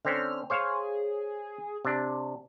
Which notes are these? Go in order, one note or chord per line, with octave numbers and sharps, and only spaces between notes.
D3 C4 C#4 F6
G#4 C5 C#5 F5
C3 D4